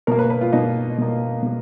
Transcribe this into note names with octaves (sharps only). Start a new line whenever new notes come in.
B2 A#3 A#4
B4
B4
F4
B2 A#3 D#4
B2 A#3
B2 A#3